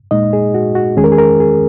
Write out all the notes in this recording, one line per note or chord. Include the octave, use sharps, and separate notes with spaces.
A#2 G#3 D#4 D#5
G#4
F#4
F#4
E2 D#3 G#3 C#4 G#4
A#4
G#4
A#4
G#4